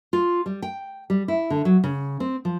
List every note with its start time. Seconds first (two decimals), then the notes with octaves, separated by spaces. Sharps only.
0.13 F4
0.46 G3
0.62 G5
1.10 G3
1.28 E4
1.50 D3
1.65 F#3
1.84 C#3
2.20 C4
2.45 F3